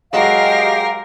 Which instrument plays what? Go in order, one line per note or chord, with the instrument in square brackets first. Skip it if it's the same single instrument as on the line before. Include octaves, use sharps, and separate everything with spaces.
[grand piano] F#3 G#3 F#4 [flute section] G4 F5 [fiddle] A#4 [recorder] D#5